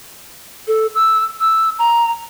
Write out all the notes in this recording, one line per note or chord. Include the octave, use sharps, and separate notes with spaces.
A4
E6
E6
A#5